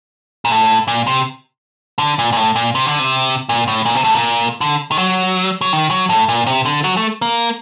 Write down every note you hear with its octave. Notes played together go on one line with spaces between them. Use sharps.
A#2
A2
A#2
C3
D3
A#2
A#2
A2
A#2
C3
D3
C3
A#2
A2
A#2
C3
A2
A#2
D3
D#3
F#3
F#3
D#3
F#3
A2
A#2
C3
D3
F#3
A3
A#3